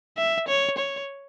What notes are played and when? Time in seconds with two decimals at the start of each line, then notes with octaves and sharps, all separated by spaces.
0.17 E5
0.48 C#5
0.78 C#5